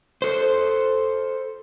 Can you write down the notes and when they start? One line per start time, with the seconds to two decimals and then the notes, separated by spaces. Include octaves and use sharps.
0.22 A4 C5